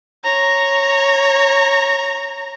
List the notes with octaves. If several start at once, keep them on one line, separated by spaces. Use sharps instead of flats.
C#5 A#5